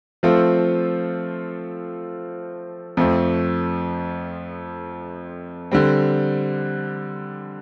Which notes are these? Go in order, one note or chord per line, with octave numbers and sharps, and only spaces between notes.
F3 A3 C4 F4 A4
F2 F3 A3 C4
D3 G3 C4